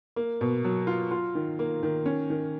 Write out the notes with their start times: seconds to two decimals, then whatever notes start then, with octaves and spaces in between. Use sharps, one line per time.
0.16 A#3
0.41 B2
0.65 F#3
0.87 F4
1.11 F4
1.35 D#3
1.59 A#3
1.83 D#3
2.06 C#4
2.30 D#3